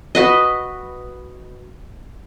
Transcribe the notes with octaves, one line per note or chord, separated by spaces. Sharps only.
F#4 B4 D#5